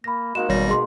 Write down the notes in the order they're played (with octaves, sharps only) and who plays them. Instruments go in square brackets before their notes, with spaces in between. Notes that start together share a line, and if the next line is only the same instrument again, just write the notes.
[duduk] A#3 [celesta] B5 A#6
[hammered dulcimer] G#3 A#3 D#4 [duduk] F#4 [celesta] E7
[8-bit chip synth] G#1 G3 A#6 [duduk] B2 [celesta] C#5
[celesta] G#4 C6